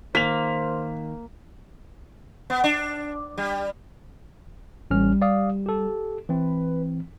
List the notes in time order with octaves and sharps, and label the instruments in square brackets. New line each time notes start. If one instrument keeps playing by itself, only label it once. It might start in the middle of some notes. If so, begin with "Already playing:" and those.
[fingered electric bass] D#3 [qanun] A#3 [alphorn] C5 [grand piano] B6 F7
[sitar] B3
D4
G3
[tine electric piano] A1 C#4 F6 [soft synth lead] G3
[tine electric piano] D5 F5 D#6
G4 A4
[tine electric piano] E3 C4 [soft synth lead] B4